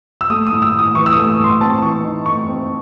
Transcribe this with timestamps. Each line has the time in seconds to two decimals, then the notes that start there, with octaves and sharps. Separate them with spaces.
0.21 E6
0.30 A3 D#6
0.47 D#6
0.52 A2
0.62 E6
0.74 A2
0.79 D#6
0.95 E3 C#6
1.06 E6
1.12 A3 D#6
1.39 A2 C6
1.61 C4 A5
1.82 E3 C#6
2.04 D#4
2.26 A3 C#6
2.48 C4